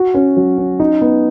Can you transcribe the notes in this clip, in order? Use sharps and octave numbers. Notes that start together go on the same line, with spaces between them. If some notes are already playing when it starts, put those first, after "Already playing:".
Already playing: F#4
C#4
F#3
C#4
D#4
B3